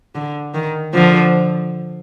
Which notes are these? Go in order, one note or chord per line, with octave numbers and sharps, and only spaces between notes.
D3
D#3
D3 F3